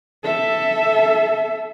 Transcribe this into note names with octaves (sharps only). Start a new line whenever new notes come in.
A4 E5